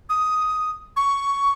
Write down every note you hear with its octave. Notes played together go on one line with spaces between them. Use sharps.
D#6
C#6